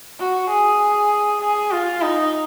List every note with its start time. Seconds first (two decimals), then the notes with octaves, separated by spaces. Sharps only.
0.20 F#4
0.50 G#4
1.41 G#4
1.71 F4
2.02 D#4